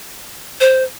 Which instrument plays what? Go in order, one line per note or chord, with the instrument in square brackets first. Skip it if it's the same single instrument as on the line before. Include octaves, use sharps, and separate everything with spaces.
[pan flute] C5